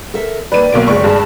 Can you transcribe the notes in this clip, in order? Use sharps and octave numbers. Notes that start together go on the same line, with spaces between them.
A4 A#4 E5
D#3 G3 A#3 B4 D5 D#7
B1 A#3 C5 D7
F#1 G#3 A3 G#4 D5 C#6
G2 A5